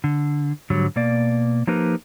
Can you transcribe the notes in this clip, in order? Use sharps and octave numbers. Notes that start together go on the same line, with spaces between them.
D3
G#2 D3 F#3 G3
B2 A#3 D5
F3 A#3 D#4 G4 A#4 B4